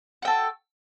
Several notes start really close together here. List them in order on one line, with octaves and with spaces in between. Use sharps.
F#4 G5 A4